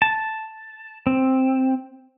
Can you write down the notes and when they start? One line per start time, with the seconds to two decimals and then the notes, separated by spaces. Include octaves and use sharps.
0.02 A5
1.07 C4